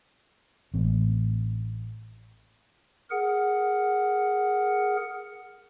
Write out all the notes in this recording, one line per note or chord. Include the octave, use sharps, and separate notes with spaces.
A1 C4
G#4 A#4 F#5